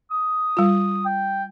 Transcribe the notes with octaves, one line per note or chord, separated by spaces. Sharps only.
D#6
G3 F4
G5